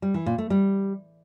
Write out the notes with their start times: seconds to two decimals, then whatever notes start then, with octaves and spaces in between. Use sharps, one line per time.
0.02 G3
0.14 E3
0.26 A#2
0.38 A3
0.50 G3